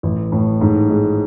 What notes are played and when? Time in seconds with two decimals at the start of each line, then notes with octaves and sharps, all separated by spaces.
0.03 A1
0.32 A2
0.61 G#2
0.90 G#3